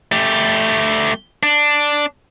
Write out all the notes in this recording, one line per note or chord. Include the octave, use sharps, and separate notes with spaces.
A3 G4
D4